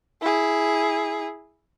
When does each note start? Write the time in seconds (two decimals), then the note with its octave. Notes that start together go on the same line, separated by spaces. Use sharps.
0.21 E4 G#4